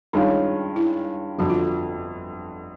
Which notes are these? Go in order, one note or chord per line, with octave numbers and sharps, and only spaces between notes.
G2 D#3 G#3 C#4 D#4 F4
E4
G1 F2 D3 F#4
F4